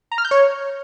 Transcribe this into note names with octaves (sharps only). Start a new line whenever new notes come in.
A#5
F6
G6
C#5